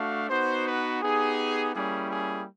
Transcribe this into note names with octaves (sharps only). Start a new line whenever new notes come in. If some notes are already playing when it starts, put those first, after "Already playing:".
Already playing: A3 D4 F#4 F5
B3 D#4 F#4 C5
B4
B3 D#4 G4 G#4
G3 A#3 C#4 E4 G#4
G#4